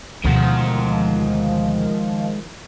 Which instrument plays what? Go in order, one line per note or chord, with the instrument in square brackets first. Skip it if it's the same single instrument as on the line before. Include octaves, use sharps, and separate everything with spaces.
[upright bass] D2 B2 [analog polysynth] D#3 F3 [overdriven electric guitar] G#3 F#5